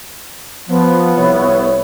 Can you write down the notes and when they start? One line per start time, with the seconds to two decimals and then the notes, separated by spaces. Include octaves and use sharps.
0.69 F3 B3
1.16 C2 C#5 E5